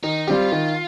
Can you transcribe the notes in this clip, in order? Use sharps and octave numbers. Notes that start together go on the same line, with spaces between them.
D#3 D#4
G3 C4 F4 G4
D#3